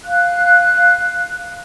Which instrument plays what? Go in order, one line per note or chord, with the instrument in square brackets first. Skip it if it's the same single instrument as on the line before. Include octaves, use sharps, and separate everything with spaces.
[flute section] F5 F#6